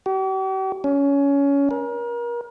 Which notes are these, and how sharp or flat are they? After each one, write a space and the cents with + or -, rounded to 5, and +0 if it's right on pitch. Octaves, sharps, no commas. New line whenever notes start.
G4 -45
C#4 +20
A#4 +35